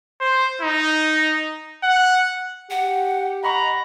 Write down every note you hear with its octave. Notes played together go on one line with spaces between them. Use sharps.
C5
D#4
F#5
G4 F#5
D#5 F#5 A#5 B5 C#6